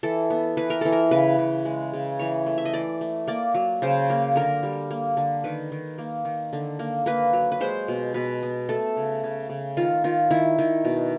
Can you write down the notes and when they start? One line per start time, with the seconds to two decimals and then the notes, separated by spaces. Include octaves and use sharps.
0.03 E3 A4
0.30 B3
0.57 E3 B4
0.70 A#4
0.81 E3 A4
0.92 A#4
1.11 C#3 B4
1.38 C#3
1.65 G#3
1.93 C#3
2.19 E3 C#5
2.46 A3
2.58 E5
2.65 D#5
2.73 E3 D5
3.01 A3
3.27 A#3 D5
3.55 F#3
3.82 C#3 C5
4.10 A#3
4.36 D3 A#4
4.63 G3
4.90 A#3
5.17 D3
5.44 D#3 B4
5.72 D#3
5.98 A#3
6.25 D#3
6.53 D3
6.79 A#3
7.06 A#3 B4
7.33 F#3
7.52 B4
7.61 G#3 C5
7.88 B2
8.14 B2 B4
8.42 B3
8.69 A3 A4
8.97 C#3
9.24 C#3
9.49 C#3
9.77 D#3 F4
10.04 D#3 F4
10.31 D#3 E4
10.59 D#3
10.85 B2